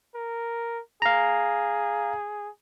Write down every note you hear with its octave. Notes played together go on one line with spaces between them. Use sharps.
A#4
G#4 F5 A#5